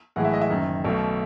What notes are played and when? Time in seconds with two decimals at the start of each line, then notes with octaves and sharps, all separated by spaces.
0.16 B1 A2 E3 G#3 F#5
0.25 E5
0.33 D#5
0.41 E5
0.50 F#1 F#2 D#3
0.84 B1 B2 A3